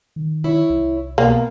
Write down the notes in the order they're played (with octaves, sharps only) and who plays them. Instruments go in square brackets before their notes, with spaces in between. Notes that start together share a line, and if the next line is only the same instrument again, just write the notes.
[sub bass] D#3
[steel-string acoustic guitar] E4 C#5
[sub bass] C2
[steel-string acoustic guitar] B2 [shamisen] A#3